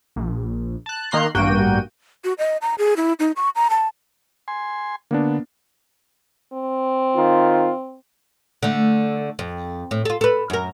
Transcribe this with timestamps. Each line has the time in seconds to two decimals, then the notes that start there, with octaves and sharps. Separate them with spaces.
0.16 A#1
0.86 A5 F#6
1.11 D#3 A#3 A#5 C6 F#6 C7
1.35 A1 G2 A#3 F#4 G5 D#7
2.24 F#4
2.38 D#5
2.62 A#5
2.79 G#4
2.97 E4
3.19 D#4
3.36 C#6
3.56 A#5
3.70 A5
4.48 G#5 C6
5.11 D3 A#3 B3 D4
6.53 C4
7.16 D#3 F4
8.63 D3 A3
9.39 F2
9.91 A2
10.05 F4 A4
10.21 A4 B4
10.50 F#2 A#4